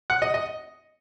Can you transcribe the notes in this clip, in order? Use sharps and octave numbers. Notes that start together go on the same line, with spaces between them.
F#5
D#5
D#5